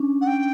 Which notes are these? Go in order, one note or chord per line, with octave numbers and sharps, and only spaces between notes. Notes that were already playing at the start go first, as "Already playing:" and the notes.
Already playing: C#4 D4
F#5
G5